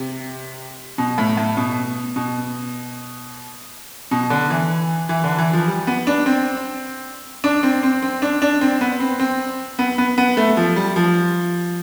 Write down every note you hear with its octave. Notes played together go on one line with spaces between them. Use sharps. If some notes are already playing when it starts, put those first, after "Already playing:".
Already playing: C3
B2
A2
A2
B2
B2
B2
D3
E3
E3
D3
E3
F3
G3
B3
D4
C4
D4
C4
C4
C4
D4
D4
C4
B3
C4
C4
B3
B3
B3
A3
F3
G3
F3